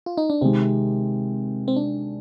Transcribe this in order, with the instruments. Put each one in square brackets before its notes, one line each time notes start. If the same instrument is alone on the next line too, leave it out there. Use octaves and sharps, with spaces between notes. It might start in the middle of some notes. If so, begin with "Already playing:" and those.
[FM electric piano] F4
D#4
D4
[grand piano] C3 D#3 G#3 [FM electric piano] C4
[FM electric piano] C4
D4